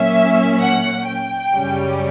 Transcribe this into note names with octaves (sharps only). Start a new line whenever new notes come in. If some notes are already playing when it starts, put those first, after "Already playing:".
Already playing: A#2 F#3 A#3 C#4 E5
F#5
G5
F#2 C#3 G3 C#4